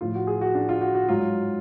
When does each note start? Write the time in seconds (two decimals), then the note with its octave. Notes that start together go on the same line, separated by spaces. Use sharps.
0.01 A2 F3 F4
0.15 F#4
0.27 G#4
0.41 F#4
0.55 D4
0.69 F4
0.81 F#4
0.95 F#4
1.08 G#2 F#3 F4